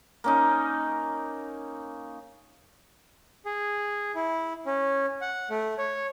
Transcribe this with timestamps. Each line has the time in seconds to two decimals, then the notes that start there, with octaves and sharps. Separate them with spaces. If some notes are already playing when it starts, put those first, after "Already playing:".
0.24 A#3 C#4 D#4
3.45 G#4
4.15 E4
4.66 C#4
5.21 F#5
5.50 A3
5.78 C#5